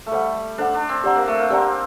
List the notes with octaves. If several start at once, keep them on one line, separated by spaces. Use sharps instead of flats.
A3
G3 A4 C5 F#5
D4 A4 C5 F#5
D4
C4
C4 G4 D5 F#5 A#5
A#3
A3
A#3
C4 G4 D5 F#5 A#5